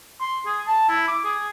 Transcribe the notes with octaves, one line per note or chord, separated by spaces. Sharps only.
C6
G#4
A5
E4
D6
G#4